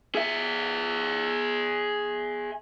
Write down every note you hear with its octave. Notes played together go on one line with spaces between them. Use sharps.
G#4 E5